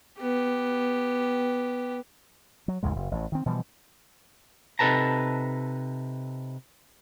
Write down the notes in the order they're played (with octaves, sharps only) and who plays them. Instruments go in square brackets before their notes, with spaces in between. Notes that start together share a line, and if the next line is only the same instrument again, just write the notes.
[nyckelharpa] B3 G4
[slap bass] F#3
G#1 D#2 C#3 G#3
F#1
A1 A2
D#3 C4
B2 E3 F3 G3
[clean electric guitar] C3 D#4 A4 B4 A5 A#5